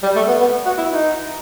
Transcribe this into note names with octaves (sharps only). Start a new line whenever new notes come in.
G3
A3
B3
B3
F#4
E4
D#4